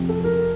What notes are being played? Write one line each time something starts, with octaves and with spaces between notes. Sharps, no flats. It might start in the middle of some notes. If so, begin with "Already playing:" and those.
Already playing: F2 C3 F3
A4
A#4